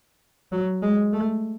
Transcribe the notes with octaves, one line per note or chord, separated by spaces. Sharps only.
F#3
G#3
A3